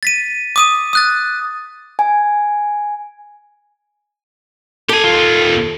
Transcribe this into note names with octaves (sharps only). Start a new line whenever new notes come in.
A6 B6 D#7
D6 D#6 D#7
D#6 F#6 A6
G#5
G4 A4 G#5
D#2 F4